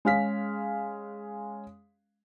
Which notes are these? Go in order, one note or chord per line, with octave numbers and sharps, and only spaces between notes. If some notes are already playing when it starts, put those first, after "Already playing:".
G#3 C#4 F5 F6 B6